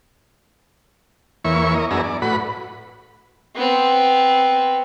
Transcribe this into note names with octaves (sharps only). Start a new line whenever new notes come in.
E2 E3 A#3 C#5 E5 C#6
A#4 D#5
F#2 B3 D4 G#4 E5 A#5
D5
A2 F#4 B4 B5
B3 C4